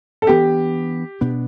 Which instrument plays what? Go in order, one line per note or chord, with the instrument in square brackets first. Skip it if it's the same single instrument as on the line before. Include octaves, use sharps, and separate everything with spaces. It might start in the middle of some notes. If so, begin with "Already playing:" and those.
[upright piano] A4
[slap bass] E3 B3 D4 [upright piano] G4
[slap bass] B2 B3 D4